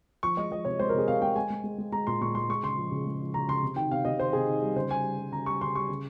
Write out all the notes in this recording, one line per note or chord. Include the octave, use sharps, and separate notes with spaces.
F3 C#6
G#3 D#5
F3 D#5
C3 C#5
G#3 C5
A#4
C3 G#4
C3 F5
G#3 G5
G#3 G#5
G#3
G#3
G#3
G#3 A#5
A#2 C6
A#2 C#6
G#3 C6
G#3 C#6
C#3 C6
F3
C#3
G#3
F3
C#3 A#5
C#3 C6
C3
D#3 G5
C3 F5
C3 D#5
D#3 C5
C3 G#4
D#3
G3
C#3 C5
G3 G#5
G3
G3
C#3 A#5
G3 C#6
C#3 C6
G3 C#6
C#3